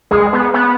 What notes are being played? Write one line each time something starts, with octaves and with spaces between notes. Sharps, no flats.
G#3 G#4
B3
B3